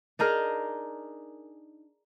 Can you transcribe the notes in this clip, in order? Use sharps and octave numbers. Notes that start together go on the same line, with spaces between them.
D4 D#4 G#4 A#4